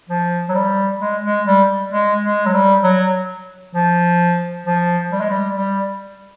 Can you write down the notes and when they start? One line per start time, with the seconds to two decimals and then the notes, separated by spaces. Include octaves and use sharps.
0.09 F3
0.49 F#3
0.55 G3
1.01 G#3
1.24 G#3
1.47 G3
1.92 G#3
2.23 G#3
2.46 F#3
2.53 G3
2.83 F#3
3.75 F3
4.66 F3
5.12 G3
5.20 G#3
5.30 G3
5.57 G3